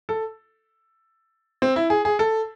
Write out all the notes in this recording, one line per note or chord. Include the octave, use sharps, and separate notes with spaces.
A4
C4
E4
G#4
G#4
A4